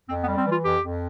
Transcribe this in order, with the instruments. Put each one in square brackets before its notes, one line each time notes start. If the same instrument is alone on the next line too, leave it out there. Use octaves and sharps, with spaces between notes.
[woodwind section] F2 C4
B3
G3
C4
E3
F4
F2 G4
F2